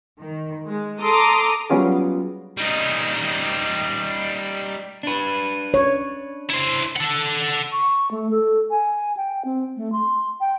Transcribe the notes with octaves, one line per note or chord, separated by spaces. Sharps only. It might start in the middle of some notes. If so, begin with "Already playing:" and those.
D#3
G#3
A4 A#5 C6 D6 D#6
F#3 G3 B3 C#4 F4 G#4
G3 D#4
D4 B4
C#5
E4 C5
A4 F#5
C#6
A3
A4
G#5
G5
C4
A3
C6
G5